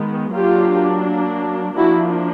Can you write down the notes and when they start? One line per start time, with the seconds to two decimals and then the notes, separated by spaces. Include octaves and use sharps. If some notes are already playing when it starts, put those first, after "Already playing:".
Already playing: D#3 G#3 B3
0.33 F#3 A#3 D4 F4 G4
1.77 F3 A#3 D4 E4 F#4